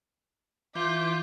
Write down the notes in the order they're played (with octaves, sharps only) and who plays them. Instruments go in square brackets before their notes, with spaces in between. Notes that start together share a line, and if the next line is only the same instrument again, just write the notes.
[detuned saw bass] E3 [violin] F4 E5 [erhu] D6 [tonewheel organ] G6